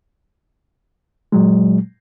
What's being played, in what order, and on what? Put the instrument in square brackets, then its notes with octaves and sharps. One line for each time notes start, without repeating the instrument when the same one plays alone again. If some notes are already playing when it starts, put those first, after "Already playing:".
[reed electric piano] A#2 F#3 G#3